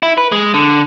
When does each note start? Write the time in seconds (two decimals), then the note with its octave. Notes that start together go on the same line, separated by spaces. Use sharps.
0.03 E4
0.18 B4
0.32 G#3
0.54 D3